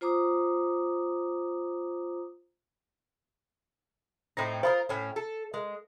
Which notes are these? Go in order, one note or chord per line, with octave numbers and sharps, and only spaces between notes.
F4 C5 A#5 D6 D#6
A2 C4 D#4 A#6
F4 A4 A#4 C5 B5 D#6
A2 C#4
A4
G#3 A#4